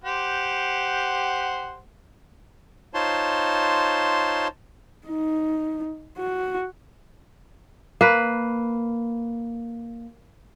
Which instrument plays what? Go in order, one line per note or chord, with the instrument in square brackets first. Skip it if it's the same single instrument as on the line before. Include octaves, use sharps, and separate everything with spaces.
[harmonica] G4 C5 F#5
[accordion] D#4 F4 C5 C#5 A5 C6
[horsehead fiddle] D#4
F#4
[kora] A#3 B4